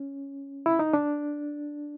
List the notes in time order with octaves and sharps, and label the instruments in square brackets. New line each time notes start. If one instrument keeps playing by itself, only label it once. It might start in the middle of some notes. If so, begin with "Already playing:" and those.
Already playing: [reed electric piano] C#4
E4
D#4
D4